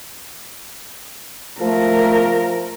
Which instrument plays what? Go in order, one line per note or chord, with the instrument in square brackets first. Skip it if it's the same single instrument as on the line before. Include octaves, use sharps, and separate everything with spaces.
[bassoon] F3 [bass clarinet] A3 [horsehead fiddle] A#4